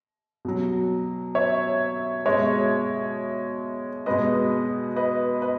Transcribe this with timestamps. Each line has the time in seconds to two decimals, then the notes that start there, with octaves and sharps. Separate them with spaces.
0.45 B2 F#3
1.35 C#5 E5
2.25 B2 G#3 C#5 E5
4.06 B2 G#3 B4 D#5
4.96 B4 D#5
5.42 B4 D#5